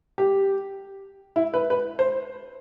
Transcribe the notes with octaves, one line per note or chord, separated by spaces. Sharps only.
G4
E4
B4
B4
C5